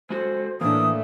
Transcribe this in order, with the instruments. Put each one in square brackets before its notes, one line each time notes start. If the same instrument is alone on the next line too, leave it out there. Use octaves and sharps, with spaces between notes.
[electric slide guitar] G#3 F#4 A4 [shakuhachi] C5
[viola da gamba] A2 A3 [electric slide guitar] E3 [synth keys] A#3 D4 [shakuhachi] D#6